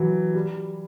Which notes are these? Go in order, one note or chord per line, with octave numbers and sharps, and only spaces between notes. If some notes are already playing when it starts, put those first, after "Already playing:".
Already playing: E3 F#3
G3